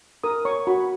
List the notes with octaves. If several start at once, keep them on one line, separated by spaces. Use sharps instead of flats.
A#4 D#6
C#5 C#6
F#4 B5